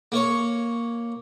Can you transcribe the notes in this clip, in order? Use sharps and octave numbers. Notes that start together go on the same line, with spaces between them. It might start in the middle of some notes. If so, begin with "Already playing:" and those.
A#3 C#5